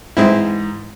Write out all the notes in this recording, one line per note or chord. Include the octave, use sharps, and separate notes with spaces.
G#2 E3 G#3 C4 E4